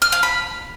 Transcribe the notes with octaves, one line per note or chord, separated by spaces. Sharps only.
F6
F5
B5